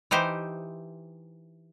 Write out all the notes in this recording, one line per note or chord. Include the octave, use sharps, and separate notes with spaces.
E3 D#4 G4 C5